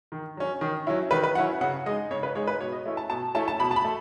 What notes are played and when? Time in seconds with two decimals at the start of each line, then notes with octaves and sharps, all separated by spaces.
0.12 D#3
0.37 F#3 C#4
0.61 D#3
0.87 F#3 C#4 E4
1.11 D#3 B4
1.23 B4
1.35 F#3 C#4 E4 F#5
1.61 C#3 F#5
1.86 G#3 D#5
1.90 D#4
2.11 C#3 C#5
2.23 B4
2.35 G#3 D#4 C#5
2.47 B4
2.60 B2 C#5
2.72 D#5
2.86 A3 C#4 E4
2.97 A5
3.10 B2 A5
3.35 A3 C#4 E4 A5
3.48 A5
3.59 B2 B5
3.71 A5
3.76 B5
3.84 A3